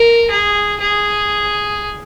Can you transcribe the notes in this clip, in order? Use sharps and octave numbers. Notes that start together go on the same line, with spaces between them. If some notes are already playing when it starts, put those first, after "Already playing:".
Already playing: A#4
G#4
G#4